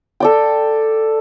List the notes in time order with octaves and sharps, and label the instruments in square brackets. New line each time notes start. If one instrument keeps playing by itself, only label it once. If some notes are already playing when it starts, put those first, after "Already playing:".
[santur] A4 D5 G5